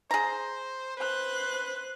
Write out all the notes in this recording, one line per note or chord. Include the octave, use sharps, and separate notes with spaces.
G#4 C5 A#5
B4 C5 F#6